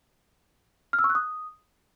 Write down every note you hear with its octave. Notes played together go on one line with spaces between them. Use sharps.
F6
E6
C#6
F#6
D#6